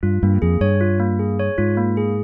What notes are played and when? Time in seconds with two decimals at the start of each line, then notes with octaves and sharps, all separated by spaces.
0.03 G2 F4
0.23 G2 A#3
0.42 F2 G#4
0.61 G2 C#5
0.81 F4
1.00 A#3
1.19 G#4
1.39 C#5
1.58 G#2 F4
1.77 A#3
1.97 G#4